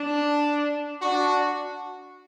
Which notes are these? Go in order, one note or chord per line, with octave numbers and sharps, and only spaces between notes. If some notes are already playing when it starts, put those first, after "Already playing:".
Already playing: D4
D4 F#4